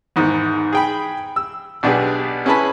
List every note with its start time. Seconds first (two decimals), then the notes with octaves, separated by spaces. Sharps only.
0.16 E2 G#2 D#3
0.73 G#4 G5 B5
1.36 E6
1.83 B1 B2 D4 G4 G#4 B4
2.46 C#4 E4 G#4 B4 A5 B5